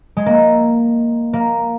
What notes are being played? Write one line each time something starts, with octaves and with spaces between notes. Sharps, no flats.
G#3
A#3
A#3